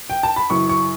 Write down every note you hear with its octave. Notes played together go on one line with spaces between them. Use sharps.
G5
A5
B5
F#2 C#3 E3 C#6
C#6